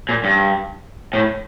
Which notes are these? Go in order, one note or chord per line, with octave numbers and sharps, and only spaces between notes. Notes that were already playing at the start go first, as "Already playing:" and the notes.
A#2
G2
A2